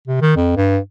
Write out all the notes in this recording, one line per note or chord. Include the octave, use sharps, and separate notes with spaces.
C3
D#3
F2
G2